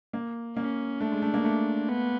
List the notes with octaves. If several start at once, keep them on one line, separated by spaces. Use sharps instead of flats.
A#3
A#3 C#4
A3 D4
G#3
A3
A#3
A3
B3